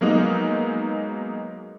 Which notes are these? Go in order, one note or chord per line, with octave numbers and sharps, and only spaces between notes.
F#3 G#3 A#3 B3 D#4